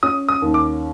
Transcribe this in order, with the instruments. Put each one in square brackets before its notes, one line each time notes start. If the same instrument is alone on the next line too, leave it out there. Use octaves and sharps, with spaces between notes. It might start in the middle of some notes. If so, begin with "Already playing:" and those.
[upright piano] C#4 D#6
D#6
D#2
D6